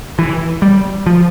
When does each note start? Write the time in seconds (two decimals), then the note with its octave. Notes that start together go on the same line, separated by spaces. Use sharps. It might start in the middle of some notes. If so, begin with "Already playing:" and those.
0.19 E3
0.62 G3
1.06 F3